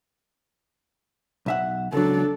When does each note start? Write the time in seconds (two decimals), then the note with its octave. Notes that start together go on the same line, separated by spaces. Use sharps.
1.46 B1 E5 F#5
1.92 C#2 F#3 D4 A4